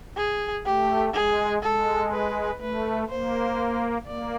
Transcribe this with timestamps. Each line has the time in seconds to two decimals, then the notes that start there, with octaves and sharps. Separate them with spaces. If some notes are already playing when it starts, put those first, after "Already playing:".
0.17 G#4
0.65 A3 G4
1.14 G#3 G#4
1.63 G#3 A4
2.12 B4
2.60 A3 B4
3.10 A#3 C5
4.07 A#3 D5